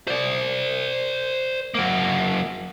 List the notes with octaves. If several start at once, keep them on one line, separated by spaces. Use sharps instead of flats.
C5 D5
F#3 A#3